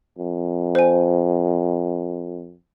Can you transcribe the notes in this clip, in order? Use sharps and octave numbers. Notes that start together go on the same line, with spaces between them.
F2
C5 G#5